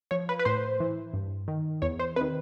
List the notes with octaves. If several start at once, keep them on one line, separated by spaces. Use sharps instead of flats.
F3 C#5
B4
B4
A2 C5
E3
G2
D#3
E2 C#5
C5
C3 D#3 B4